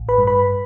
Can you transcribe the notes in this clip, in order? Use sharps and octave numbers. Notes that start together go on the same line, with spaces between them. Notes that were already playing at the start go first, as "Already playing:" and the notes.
Already playing: A1
B4 B5
G2
B4 B5